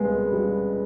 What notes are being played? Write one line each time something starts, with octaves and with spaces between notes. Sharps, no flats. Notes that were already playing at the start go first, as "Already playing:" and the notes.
Already playing: C#2 G3 G#3 B3
G3